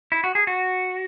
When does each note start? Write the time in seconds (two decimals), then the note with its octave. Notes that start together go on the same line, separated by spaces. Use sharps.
0.12 E4
0.24 F#4
0.35 G#4
0.47 F#4